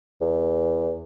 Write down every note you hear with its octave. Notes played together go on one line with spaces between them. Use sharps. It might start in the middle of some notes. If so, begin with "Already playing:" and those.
E2